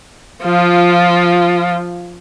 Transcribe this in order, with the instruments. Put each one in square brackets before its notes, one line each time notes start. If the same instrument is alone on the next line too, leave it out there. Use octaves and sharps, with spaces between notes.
[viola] F3 F4